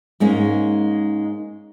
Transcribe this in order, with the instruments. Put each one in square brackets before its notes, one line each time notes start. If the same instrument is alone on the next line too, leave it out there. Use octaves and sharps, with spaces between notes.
[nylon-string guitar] G#2 G#3 A#3 C#4